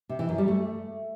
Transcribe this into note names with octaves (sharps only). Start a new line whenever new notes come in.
C3
E3
F#2
G3
A3